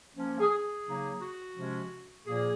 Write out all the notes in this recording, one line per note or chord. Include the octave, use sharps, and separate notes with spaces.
F3 A#3 C#4
G#4
G#4
C#3 F#3 A#3 D#4
F#4
C3 F3 G#3 C#4
A#2 F3 A#3 G#4